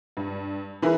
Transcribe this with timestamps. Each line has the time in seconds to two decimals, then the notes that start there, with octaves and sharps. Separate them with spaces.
0.17 G2
0.82 E3 E4 G#4 A#4 B4